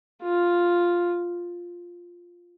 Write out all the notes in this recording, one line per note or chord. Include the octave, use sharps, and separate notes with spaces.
F4